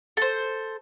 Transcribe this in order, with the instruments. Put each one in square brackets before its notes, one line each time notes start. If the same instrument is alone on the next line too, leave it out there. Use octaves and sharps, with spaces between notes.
[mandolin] A4 C5